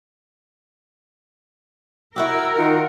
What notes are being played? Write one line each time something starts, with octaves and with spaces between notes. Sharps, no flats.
E4 F#4 G4 A#4 E6
D#3 F4 F#5